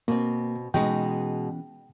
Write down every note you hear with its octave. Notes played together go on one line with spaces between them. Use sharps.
B2 A#3 C4
B2 E3 G#3 B3 C#4 D#4 G5